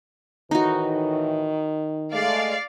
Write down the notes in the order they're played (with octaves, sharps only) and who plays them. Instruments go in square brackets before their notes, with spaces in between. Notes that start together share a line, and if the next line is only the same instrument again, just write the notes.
[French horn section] A2 E3 [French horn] D#3 [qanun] D#4 F#4
[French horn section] G#3 A3 [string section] D5 F5